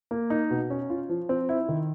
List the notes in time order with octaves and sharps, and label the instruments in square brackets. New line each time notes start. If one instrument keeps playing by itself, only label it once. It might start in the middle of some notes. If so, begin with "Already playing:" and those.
[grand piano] A#3
D#4
B2
C#4
F4
F3
C4
E4
D#3